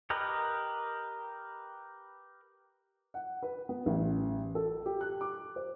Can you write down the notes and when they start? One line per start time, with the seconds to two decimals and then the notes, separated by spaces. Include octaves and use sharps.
0.10 G4 A#4 B4 D#5
3.14 F#5
3.43 B4
3.69 B3
3.86 A1
4.55 A4
4.86 G4
5.01 F#6
5.21 D6
5.56 C5